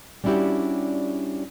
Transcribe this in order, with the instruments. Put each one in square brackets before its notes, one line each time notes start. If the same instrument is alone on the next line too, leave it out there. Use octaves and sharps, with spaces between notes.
[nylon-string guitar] G3 C#4 D4 E4 F#4 G4